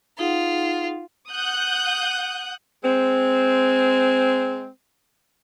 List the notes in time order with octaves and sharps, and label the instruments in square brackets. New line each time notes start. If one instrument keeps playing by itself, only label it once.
[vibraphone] D#4 G#4 F#5 [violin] F4
[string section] F#5 D#6 F#6 G6
[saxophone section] G#3 C4